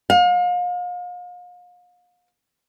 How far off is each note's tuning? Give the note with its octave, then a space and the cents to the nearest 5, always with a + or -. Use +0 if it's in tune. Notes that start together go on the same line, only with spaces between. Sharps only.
F5 +40